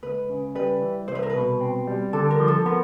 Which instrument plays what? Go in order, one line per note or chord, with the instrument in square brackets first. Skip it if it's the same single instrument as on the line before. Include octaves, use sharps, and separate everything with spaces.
[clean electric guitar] C#2 [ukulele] B4
[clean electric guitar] C#3
[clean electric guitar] G3 [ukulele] B4
[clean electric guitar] E3
[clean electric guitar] C2 [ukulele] C5
[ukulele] B4
A#4
B4
[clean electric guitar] B2
C4
G3
[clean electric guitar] D3 [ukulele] A4
[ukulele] A#4
[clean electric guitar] F3
[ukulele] A4
[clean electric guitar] B3 [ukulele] A#4